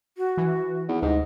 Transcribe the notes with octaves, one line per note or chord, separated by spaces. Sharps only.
F#4
E3
E2
D2 G#2 C3 D#5